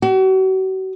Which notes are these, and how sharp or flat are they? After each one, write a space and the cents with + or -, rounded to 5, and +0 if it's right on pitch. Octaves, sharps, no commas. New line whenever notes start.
F#4 +40